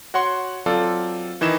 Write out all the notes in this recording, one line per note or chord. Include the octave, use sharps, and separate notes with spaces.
F#4 C#5 F#5 C6
F#3 C4 F4 A4 D5
D#3 E3 E4 D#5 E7